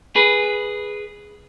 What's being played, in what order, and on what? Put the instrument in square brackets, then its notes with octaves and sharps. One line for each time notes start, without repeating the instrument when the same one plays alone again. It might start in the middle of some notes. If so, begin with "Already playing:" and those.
[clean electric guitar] G#4 B4